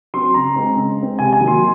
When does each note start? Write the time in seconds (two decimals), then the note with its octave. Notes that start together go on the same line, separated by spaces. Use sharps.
0.14 F#3 C4 C6
0.34 C#3 A#5
0.56 G#3 C4
0.77 C#3
0.99 G#3 C4
1.19 C3 G#5
1.33 G#5
1.40 D#3 F#3 A#3
1.48 C6